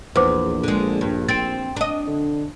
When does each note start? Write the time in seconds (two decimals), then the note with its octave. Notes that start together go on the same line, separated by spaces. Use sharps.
0.16 A#1 E2 B4 C5 D6
0.63 D3 G#3
1.01 G2
1.29 C4 A6 D7
1.76 D4 D#5
2.08 D3